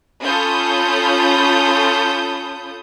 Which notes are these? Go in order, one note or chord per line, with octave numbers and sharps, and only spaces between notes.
C#4 F4 A4 B5 D#6 G6